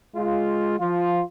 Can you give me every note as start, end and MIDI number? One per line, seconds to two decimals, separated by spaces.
0.16 0.78 56
0.16 0.78 65
0.80 1.22 53
0.80 1.22 65